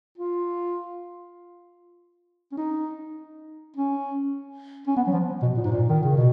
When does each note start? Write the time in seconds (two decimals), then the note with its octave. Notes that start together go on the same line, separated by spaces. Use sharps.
0.18 F4
2.52 C#4
2.57 D#4
3.77 C#4
4.87 C#4
4.97 B3
5.07 F#3
5.12 F3
5.42 B2
5.57 A#2
5.64 G#2
5.72 A#2
5.89 D#3
6.03 C#3
6.17 B2